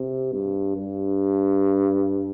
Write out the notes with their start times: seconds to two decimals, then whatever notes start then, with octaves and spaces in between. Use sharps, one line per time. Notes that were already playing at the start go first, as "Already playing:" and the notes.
Already playing: C3
0.33 G2
0.76 G2